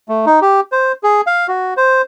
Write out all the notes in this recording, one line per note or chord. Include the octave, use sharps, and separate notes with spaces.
A3
D#4
G4
C5
G#4
F5
F#4
C5